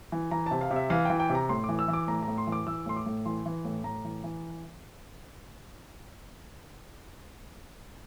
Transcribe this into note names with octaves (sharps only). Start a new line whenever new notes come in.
E3
E3 A#5
C3 A5
F5
C3
E5
E3 F5
E3 G5
G5
C3
A#5
A2 C6
E3 D6
E6
E3
D6
A2 A#5
A#5
A2
C6
E3
D6
E3 E6
A2 C6
D6
A2
E3 C6
E3
A2
A2 A#5
E3
E3